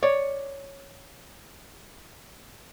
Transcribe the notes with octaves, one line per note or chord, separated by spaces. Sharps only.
C#5 D5